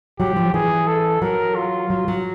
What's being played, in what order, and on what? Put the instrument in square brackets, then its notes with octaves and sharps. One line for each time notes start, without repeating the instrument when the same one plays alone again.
[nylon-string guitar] F#3 [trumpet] G4
[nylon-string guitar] F3
[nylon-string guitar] E3 [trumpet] G#4
[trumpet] A4
[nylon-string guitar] F#3 [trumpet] A#4
[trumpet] F4
[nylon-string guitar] F#3
F#3